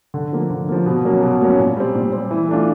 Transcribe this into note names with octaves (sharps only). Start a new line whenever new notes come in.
D3
F3 A#3
D3
F3 A#3
B2
F#3 A#3 C#4
B2
F#3 A#3 C#4
A#2
G3 C4
A#2
G3 C4
E3
A3 D4 F4